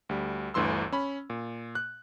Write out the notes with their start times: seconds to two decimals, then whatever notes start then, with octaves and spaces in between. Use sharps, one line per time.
0.09 D2 G3
0.54 G1 D2 E3 C6 E6
0.92 C#4 B5
1.30 A#2
1.75 F#6